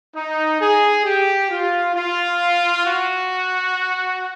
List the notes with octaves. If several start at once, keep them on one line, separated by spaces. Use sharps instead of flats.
D#4
G#4
G4
F4
F4
F#4